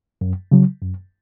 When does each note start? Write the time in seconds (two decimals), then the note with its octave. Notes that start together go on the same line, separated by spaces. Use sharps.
0.21 F#2
0.52 C#3 F#3
0.82 F#2